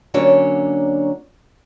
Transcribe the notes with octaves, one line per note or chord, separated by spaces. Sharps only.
D3 F#3 A#3 C#4 D4 C#5